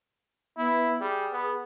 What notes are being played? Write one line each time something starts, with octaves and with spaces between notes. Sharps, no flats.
B3 E4
G3 G#4
B3